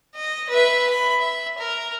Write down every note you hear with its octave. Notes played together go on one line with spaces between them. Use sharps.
D#5
B4 E5
B5
E5
A#4